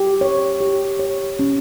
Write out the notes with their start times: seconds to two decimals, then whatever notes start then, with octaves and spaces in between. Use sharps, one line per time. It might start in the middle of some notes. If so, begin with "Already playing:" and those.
Already playing: G4
0.21 C#5
0.61 G4
0.99 C#5
1.39 C#4